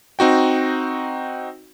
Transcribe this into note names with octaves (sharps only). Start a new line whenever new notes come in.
C4 D#4 F#4 G5